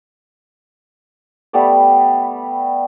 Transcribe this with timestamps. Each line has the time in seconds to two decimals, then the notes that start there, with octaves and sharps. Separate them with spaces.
1.53 G3 A3 B3 D5